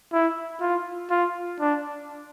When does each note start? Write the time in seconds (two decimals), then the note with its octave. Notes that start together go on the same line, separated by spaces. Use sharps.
0.13 E4
0.61 F4
1.10 F4
1.60 D4